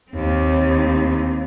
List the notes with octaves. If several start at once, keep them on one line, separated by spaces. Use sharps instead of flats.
D#2 C4